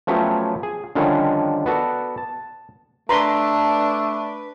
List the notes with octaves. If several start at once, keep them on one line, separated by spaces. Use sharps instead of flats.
F3 F#3 A3 B3 C#4 G4
G#4
D3 D#3 F3 G3 C#4 D4
B3 F#4 A4 D5
A5
A3 D4 B4 A#5 C6